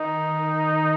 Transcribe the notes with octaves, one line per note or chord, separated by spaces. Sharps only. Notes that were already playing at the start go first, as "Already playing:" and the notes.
Already playing: D#3 D#4